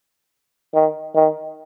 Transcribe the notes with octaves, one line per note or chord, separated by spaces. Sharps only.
D#3
D#3